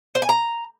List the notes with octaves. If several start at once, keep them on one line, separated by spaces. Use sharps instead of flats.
C5
G#5
A#5